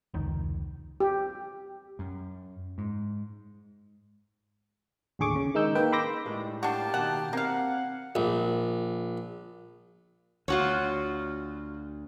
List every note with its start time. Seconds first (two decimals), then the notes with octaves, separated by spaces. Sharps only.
0.14 F1 C#2 D#3
1.00 G4
1.99 F#2
2.78 G#2
5.19 A1 D#2 D3 G#4 C#6 D6
5.36 C#3
5.54 D#3 G#3 D#4 E6 G6
5.75 A#3 D#4 B4 G5
5.92 B5 C6 D6 E6 G6 A#6
6.26 A2 G3 G#3
6.63 A#3 D4 F#4 G4 A5
6.94 B2 D#3 F#5
7.33 A#3 C4 F5 F#5
8.15 A#1
10.48 D2 F4 F#4 C#5